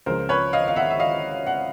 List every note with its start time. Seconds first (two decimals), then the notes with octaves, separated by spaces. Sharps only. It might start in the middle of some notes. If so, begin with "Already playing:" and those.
0.06 C#2 C#3 F3 A#4 C5
0.29 B4 C#5
0.53 D#5 F5
0.68 F5
0.76 E5 F#5
0.90 E5
0.99 D#5 F5
1.46 F#5